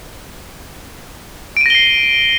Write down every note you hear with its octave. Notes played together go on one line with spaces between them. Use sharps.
A#6 C7 D7 D#7 G7